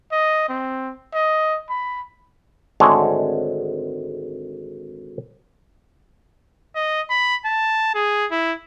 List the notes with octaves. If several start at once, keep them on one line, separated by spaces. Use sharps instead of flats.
D#5
C4
D#5
B5
G#1 D3 G#3 A3 C#5 G#5
D#5
B5
A5
G#4
E4